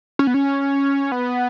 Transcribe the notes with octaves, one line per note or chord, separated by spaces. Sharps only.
C#4
B3
C#4
B3